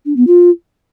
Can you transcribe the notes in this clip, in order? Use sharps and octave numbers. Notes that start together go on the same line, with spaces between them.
D4
B3
F4